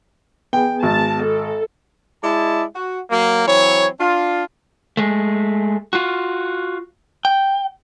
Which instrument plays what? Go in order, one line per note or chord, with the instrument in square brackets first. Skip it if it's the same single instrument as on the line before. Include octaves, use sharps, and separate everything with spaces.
[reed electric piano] B3 G#4 [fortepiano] G5
[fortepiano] G#1 [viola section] A5
[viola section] A4
[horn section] G#3 E4 D5 D#5 A5
F#4
F#3 A#3
E3 F#3 C4 C#5
D4 F4
[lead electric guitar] G#3 A3
F4 F#4
G5